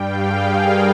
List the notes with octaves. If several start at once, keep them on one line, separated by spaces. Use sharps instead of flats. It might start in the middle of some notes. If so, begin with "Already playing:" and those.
Already playing: G2 G3 F5 G5
G#4
A#4